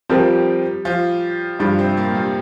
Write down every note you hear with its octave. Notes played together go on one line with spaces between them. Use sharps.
F3 G3 C4 G4 A#4
F3 F4
G2 F3 G3 D4 F4
C3 C4
A#2 A#3
G2 G3